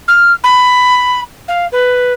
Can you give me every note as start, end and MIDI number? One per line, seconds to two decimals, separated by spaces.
0.08 0.32 89
0.43 1.20 83
1.48 1.65 77
1.72 2.13 71